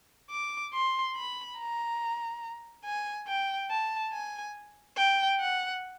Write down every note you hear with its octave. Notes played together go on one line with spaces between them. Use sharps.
D6
C6
B5
A#5
G#5
G5
A5
G#5
G5
F#5